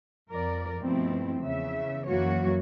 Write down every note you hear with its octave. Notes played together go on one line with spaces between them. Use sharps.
F2 A#4 D5
G2 B2 F3 A3 C4 E4
E2 C#3 E5
F#2 E3 F#3 A#3 F#4 C#5